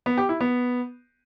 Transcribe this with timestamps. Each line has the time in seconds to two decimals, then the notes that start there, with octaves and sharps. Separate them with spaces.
0.06 B3
0.18 G4
0.29 E4
0.40 B3